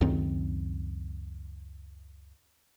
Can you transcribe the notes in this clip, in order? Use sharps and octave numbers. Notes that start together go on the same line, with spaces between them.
C#2 F#2 D#3 C4